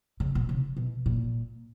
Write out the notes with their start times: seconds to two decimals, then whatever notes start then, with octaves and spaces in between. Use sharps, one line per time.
0.20 C#3
0.35 B2
0.49 C#3
0.77 B2
1.06 A#2